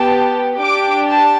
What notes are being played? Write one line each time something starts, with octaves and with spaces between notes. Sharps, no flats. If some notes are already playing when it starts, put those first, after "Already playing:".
Already playing: B3 G4 A5
D4 G4 D6
A5